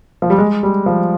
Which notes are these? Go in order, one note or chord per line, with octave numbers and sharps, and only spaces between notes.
F3
G3
G#3
G3
F3